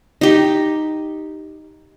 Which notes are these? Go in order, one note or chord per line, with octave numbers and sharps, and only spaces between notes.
D#4 G4